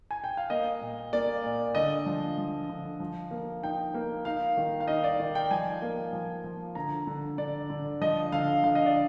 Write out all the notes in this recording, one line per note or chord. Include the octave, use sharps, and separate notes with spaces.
G#5
G5
F5
A#3 D#5
A#2
A#3 D5
A#2
D3 D#5
F3
F3
D3
F3
A#3
D#4 G5
A#3
D#4 F5
D#3
F5
D#4 D#5
D5
D#3
G5
F3 G#5
A#3
F3
F3
D3 A#5
D3
D3 D5
D3
F3 D#5
D3 F5
D3 F5
D#5
D5